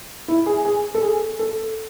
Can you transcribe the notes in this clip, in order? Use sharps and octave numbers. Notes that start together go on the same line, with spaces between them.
E4
G#4
G#4
A4
G#4
A4